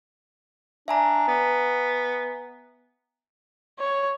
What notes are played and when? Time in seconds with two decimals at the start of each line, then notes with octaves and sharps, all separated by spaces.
0.88 D4 E5 G#5 A#5
1.28 B3
3.79 C#5